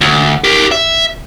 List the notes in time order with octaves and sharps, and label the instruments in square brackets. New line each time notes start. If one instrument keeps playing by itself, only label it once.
[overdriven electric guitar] D2
G4 A#4
E5